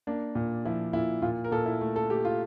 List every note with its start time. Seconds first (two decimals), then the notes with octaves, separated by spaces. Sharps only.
0.07 A#3 D4
0.35 A#2
0.65 F3 E4
0.93 A#2 E4
1.22 A#2 F4
1.44 A#4
1.51 A#2 A4
1.66 E4
1.81 A3
1.96 A4
2.09 A3 G4
2.25 F4